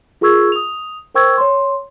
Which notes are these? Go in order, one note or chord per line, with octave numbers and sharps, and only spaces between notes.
F4 G#4 A#4 C#6 E6 G#6
D#6 F7
A#4 C5 G5 C#6 E6 G#6
C#5 C6